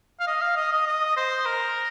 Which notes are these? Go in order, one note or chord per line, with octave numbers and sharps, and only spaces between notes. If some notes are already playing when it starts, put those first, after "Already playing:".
F5
D#5
F5
D#5
D#5
D#5
C5
A#4